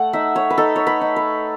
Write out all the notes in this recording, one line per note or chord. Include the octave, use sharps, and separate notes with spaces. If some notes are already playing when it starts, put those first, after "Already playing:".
Already playing: A3 F#5
D#4 E5
C#5
B4
D#4 A4
C#5
B4
D#4
B4